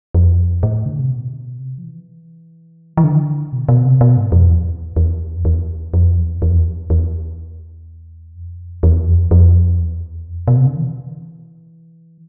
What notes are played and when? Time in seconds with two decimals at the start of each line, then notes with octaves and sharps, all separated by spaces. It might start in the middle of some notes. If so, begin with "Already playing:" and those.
0.15 F2
0.63 A2
0.86 D3
0.99 C3
1.11 B2
1.59 C3
1.78 F3
1.84 E3
2.97 E3
3.04 D3
3.53 B2
3.69 B2
3.85 C3
4.01 B2
4.17 G#2
4.32 F2
4.49 E2
4.96 E2
5.36 F2
5.45 E2
5.94 F2
6.18 E2
6.42 E2
6.50 F2
6.57 E2
6.90 E2
8.35 F2
8.83 E2
9.07 F2
9.31 F2
9.80 E2
10.28 F2
10.48 B2
10.57 C3
10.67 D3
10.76 E3